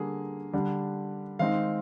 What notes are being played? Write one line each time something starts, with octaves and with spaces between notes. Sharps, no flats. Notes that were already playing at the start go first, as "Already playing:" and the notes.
Already playing: D3 G3 A#3 G#4
D3 G3 D4
D#3 G#3 C4 D#4 F5